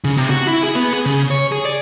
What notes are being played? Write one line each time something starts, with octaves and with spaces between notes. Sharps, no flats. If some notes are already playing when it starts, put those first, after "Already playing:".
C#3
C3
F#4
E4
G#4
B3
G#4
C#3
C#5
G#4
D5